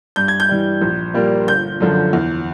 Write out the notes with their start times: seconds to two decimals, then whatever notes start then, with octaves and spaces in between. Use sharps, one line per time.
0.16 G2 G6
0.28 G#6
0.40 G6
0.49 E3 G3
0.81 A#1
1.14 A#2 G3 A#3
1.47 G1 G6
1.80 F#2 D3 F3
2.13 E2